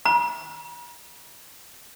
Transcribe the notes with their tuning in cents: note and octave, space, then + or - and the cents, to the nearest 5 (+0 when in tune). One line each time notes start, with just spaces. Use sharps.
A#5 +45